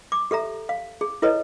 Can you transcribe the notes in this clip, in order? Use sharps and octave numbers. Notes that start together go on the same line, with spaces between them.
D6
G4 A4 E5 A#5
F5
G#4
E4 A4 B4 C#5 D#5 A#5